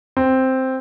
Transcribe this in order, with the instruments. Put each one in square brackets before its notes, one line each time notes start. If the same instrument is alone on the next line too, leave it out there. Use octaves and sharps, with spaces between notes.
[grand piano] C4